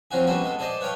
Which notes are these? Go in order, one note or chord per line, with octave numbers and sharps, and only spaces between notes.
F3 F#3 C4 F4 F#4 G#4
G3 B3 C#4 F#4 G#4 A4
G#3 B3 A4
G#4 A4 C5 D5 D#5 A5
B4 C#5 F5 G5 C6